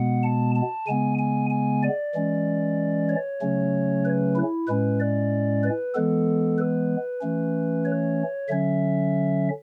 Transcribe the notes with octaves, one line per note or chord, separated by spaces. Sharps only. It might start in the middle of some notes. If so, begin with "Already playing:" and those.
Already playing: B2 G#3 B3 F#5
A5
A5
C#3 G#3 B3 G#5
G#5
G#5
D5
E3 G#3 C#4
C#5
C#3 F#3 A3 C#4
B4
E4
A2 G#3 C#4 B4
D5
B4
E3 G#3 B3 A4
B4
E3 A3 C#4
C#5
D3 F#3 C#4 E5